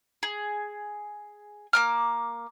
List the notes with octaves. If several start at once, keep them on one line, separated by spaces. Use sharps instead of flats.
G#4
A#3 D6 F6